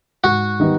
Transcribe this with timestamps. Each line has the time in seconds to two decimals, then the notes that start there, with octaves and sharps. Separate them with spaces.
0.24 G#2 F#4
0.60 D#3 G3 B3 D#4